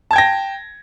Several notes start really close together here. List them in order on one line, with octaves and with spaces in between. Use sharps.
A5 G#6 G5 A#6